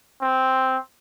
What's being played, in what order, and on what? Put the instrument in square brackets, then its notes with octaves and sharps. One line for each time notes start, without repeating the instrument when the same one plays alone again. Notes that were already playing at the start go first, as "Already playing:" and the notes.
[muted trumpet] C4